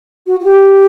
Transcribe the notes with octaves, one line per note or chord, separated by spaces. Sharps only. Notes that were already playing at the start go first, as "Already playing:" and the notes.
F#4
F#4
G4